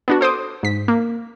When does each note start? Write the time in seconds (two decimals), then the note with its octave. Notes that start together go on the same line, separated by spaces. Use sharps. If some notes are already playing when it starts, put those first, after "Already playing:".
0.08 B3 D4 F#4
0.21 A4 C5 D6 D#6
0.63 G#2 B6
0.88 A#3